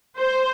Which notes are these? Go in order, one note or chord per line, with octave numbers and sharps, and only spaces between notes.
C5